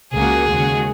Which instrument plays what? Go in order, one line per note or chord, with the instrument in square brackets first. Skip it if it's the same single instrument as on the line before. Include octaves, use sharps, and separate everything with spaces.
[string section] C#2 C#3 A#3 F#4 [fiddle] G#4
[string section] D#2 C#3 G#3 F#4